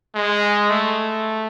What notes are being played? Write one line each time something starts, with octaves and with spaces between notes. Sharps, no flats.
G#3
A3